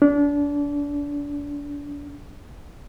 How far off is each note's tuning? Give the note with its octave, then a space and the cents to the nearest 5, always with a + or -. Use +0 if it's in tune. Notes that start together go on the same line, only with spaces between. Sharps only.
D4 -30